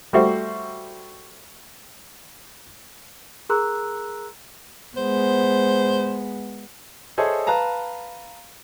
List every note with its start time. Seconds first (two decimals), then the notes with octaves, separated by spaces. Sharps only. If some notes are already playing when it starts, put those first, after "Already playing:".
0.13 G3 A3 F#4 C5 E5
3.49 G#4 A#4 A#5 C6 E6 F#6
4.97 G#3 B3 C5
7.18 G#4 A4 C5 C#5 D#5 E5
7.47 B4 F5 A5 A#5